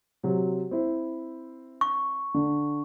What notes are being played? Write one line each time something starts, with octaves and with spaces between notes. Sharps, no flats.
C3 F#3
C4 E4
C#6
D3